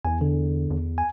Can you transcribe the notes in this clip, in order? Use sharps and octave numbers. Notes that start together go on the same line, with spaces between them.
E2 G#5
D3
E2
G#5